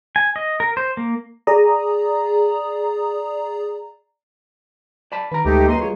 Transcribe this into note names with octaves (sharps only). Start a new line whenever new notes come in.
G#5
D#5
A#4
C5
A#3
G#4 D5 A#5 D#6
D5 A5 B5
D#3 B4 A#5
D2 G#3 A3 D#4 G4
F#2 A#3 B4 D#5 A#5 C6
G3 F4 G#4 C#5